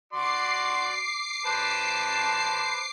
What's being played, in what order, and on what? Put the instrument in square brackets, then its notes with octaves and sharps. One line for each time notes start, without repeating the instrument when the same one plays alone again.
[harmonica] F#4 D5 C6 [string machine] D6 C7
[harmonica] B4 C5 A5